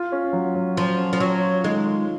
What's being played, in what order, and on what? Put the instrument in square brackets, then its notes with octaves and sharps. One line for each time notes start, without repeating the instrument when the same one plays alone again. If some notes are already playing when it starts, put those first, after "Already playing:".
Already playing: [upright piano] F4
C#4
F#3
F#3
[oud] F3 [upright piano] F#3
[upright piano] C#4
[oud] F3
[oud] F#3 [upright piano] F4
[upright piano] F4
[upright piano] D#3 [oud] G#3
[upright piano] F4